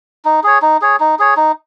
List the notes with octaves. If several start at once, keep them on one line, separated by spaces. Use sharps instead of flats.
D#4
G#4 C#5
D#4
G#4 C#5
D#4
G#4 C#5
D#4